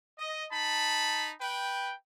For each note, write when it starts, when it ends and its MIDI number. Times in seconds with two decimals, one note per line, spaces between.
0.18 0.45 75
0.51 1.32 63
0.51 1.32 81
0.51 1.32 83
1.41 1.93 71
1.41 1.93 79